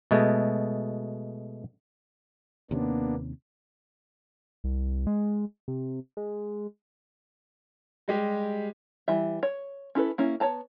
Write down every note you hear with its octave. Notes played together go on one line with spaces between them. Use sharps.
B2 G#3 A3
D#2 C3 A#3 B3 C#4 D4
C2
G#3
C3
G#3
G3 G#3 G4
E3 G3 E5
C#5
C#4 E4 A4 B4
A#3 C#4 E4
B3 C#5 D5 A5 A#5